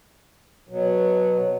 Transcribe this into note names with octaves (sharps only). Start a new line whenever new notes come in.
B2 F#3